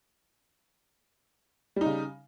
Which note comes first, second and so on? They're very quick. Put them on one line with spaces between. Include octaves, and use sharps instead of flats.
G3 D#4 C#3